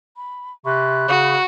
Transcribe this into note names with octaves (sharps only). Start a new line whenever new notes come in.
B5
C3 B5 C#6 F#6
C#3 F#4